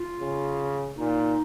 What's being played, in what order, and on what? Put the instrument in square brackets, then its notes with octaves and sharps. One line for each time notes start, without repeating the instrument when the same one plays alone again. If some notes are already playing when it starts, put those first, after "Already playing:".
Already playing: [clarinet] F4
[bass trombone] C#3
[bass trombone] A#2 [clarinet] D#4